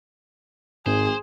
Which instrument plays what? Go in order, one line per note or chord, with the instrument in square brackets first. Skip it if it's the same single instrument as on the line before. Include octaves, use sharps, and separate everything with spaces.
[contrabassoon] G#1 [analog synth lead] G#2 [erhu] G#4 [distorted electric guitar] C5